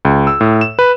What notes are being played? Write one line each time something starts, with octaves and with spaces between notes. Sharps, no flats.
C#2
E6
A2
E7
B4